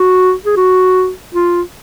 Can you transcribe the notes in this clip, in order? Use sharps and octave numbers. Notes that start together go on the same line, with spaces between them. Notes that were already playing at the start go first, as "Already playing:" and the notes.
Already playing: F#4
G#4
F#4
F4